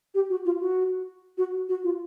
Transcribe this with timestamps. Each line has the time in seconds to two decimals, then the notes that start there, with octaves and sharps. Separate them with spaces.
0.15 G4
0.30 F#4
0.45 F4
0.60 F#4
1.38 F#4
1.69 F#4
1.84 F4